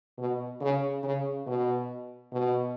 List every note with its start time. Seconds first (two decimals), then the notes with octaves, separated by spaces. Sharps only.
0.18 B2
0.61 C#3
1.03 C#3
1.46 B2
2.32 B2